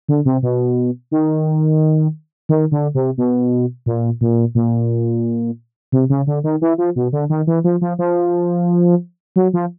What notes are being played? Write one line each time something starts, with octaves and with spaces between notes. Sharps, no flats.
D3
C3
B2
D#3
D#3
D3
C3
B2
A#2
A#2
A#2
C3
C#3
D3
D#3
E3
F3
B2
D3
D#3
E3
F3
F3
F3
F#3
F3